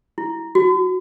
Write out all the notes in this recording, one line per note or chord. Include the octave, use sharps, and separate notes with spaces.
E4
F#4